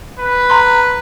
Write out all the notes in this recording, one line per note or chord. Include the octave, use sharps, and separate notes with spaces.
B4
A#5 C6